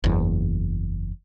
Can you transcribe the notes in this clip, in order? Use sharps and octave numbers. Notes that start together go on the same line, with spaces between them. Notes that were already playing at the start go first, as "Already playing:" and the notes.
F#1 E2